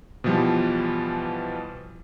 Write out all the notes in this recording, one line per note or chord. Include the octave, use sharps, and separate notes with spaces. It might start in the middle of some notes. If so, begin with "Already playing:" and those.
B2 E3 F3 G3